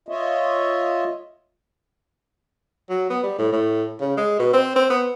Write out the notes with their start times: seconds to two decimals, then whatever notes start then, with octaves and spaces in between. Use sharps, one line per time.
0.09 F4 C#5 D#5 E5
2.89 F#3
3.10 B3
3.23 G3
3.39 A2
3.53 A2
4.01 C#3
4.17 G#3
4.39 B2
4.54 C4
4.76 C4
4.90 B3